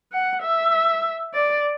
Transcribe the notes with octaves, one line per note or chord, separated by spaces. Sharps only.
F#5
E5
D5